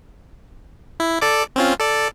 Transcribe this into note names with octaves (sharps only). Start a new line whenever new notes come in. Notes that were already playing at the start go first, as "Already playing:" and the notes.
E4
A4 D5 D6
C4 C#4 F4
A4 D5